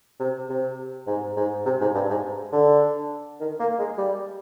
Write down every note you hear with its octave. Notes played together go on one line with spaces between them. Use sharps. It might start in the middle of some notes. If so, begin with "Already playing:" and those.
C3
C3
G#2
G#2
C3
G#2
G2
G#2
D3
D#3
A#3
G#3
G3